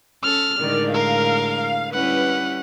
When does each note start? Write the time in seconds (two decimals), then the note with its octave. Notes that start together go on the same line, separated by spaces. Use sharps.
0.23 C#4 A4 F6
0.60 A2 D3 D#3 G#3 D5
0.94 A#4 F5
1.93 G3 C#4 E4 B4 F#5